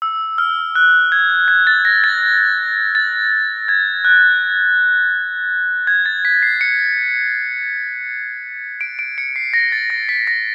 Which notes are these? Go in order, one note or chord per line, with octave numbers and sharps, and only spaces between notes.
E6
F6
F#6
G#6
G#6
A6
A#6
A6
A6
G#6
F#6
G#6
A6
B6
C7
C#7
D7
D7
C#7
C7
A#6
A6
A#6
B6
A#6